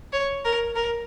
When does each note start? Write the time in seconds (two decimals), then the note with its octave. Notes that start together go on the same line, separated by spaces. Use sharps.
0.13 C#5
0.45 A#4
0.76 A#4